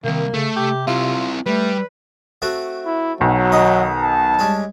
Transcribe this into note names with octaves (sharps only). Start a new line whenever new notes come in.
C2 C3 D#3 A#3
C#3 A3
C3 G4
C4 E4 F4
G3 A3 B4
A3 C4 F#4
E4
B1 B2 F#3
D#2 D#4 D#5
A5
G3 G#3 C#4